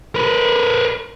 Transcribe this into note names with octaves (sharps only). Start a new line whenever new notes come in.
A#4 B4